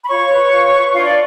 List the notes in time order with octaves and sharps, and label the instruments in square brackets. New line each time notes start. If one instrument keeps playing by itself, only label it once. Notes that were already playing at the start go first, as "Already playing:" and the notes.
[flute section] B5
F4 C#5 C#6
B4
F4
B4
D4 F4 F5
D5